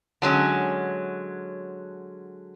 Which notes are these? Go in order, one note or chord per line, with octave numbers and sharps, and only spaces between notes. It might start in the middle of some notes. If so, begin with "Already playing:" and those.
D3 F#3 G#3 C#4